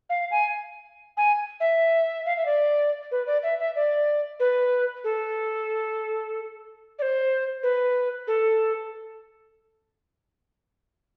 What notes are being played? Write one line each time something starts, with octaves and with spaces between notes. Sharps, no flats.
F5
G#5
G#5
E5
F5
E5
D5
B4
D5
E5
E5
D5
B4
A4
D5
C5
B4
A4